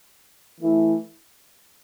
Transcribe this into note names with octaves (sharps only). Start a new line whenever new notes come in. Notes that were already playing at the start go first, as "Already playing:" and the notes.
E3 A3 E4